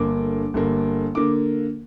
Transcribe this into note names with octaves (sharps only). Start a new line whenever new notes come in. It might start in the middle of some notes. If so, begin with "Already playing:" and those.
Already playing: G1 G2 D3 A#3 D6
G1 G2 D3 A#3
D3 A#3 D6